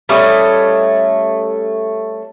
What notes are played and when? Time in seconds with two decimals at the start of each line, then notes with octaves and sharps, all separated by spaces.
0.09 G3 A3 C#4 D#5